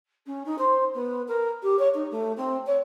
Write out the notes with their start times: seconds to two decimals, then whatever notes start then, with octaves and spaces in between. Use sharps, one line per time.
0.26 C#4
0.45 D#4
0.58 C5
0.94 B3
1.27 A#4
1.62 G4
1.78 C#5
1.94 D#4
2.11 A3
2.36 C4
2.66 C#5